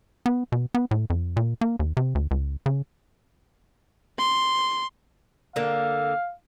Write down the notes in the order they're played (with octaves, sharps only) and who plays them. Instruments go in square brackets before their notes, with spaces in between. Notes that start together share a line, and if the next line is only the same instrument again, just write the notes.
[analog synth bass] B3
B2
B3
A2
F2
A#2
A#3
D#2
C3
D2
C#2
C#3
[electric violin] C6
[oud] D3 A#3 [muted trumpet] F5